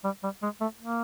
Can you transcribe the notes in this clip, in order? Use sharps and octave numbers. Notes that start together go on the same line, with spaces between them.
G3
G3
G#3
A3
A#3